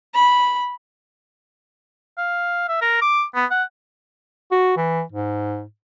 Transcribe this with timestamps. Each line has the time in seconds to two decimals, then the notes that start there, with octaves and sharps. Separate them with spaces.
0.14 B5
2.18 F5
2.69 E5
2.82 A#4
3.01 D6
3.35 B3
3.51 F#5
4.51 F#4
4.77 E3
5.12 G#2